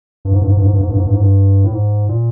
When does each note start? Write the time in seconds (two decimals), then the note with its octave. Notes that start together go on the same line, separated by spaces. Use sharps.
0.25 G2
0.33 G#2
0.42 G2
0.49 G#2
0.57 G2
0.65 G#2
0.73 G2
0.81 G#2
0.89 G2
0.97 G#2
1.05 G2
1.13 G#2
1.21 G2
1.64 A2
1.72 G#2
2.09 A#2